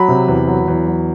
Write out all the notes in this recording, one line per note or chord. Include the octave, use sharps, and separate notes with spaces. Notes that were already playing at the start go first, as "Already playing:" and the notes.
Already playing: F#3 B5
C3
E2
F#3
E2
F#3